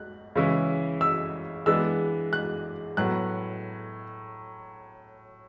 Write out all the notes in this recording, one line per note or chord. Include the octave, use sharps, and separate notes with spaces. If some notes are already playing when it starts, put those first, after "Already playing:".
Already playing: F#6
C#3 E3 G#3 C#4 E4
E6
E3 G#3 B3 D4 E6
F#6
A2 F#3 B3 F#6